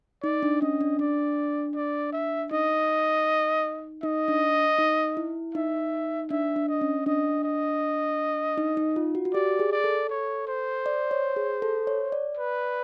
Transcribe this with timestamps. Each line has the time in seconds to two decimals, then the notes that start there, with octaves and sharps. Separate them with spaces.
0.23 D#4 D5
0.43 D4
0.61 C#4 D#5
0.81 D4
0.99 D4 D5
1.75 D5
2.13 E5
2.51 D#4 D#5
4.03 D#4 D#5
4.28 D4
4.78 D#4
5.17 E4
5.55 D#4 E5
6.31 D4 E5
6.56 D4
6.68 D#5
6.81 C#4
7.06 D4 D#5
7.44 D#5
8.58 D#4
8.77 D#4
8.96 F4
9.15 F#4
9.25 F#4
9.34 G4 D5
9.59 G#4
9.72 D5
9.84 A4
10.10 C#5
10.48 C5
10.86 D5
11.11 C#5
11.36 G#4
11.62 A4
11.87 C#5
12.12 D5
12.37 B4